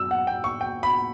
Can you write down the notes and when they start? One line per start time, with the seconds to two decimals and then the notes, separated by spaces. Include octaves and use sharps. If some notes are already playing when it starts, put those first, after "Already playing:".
Already playing: F#2 E6
0.11 F#5
0.27 G5
0.44 C#6
0.61 G5
0.83 B5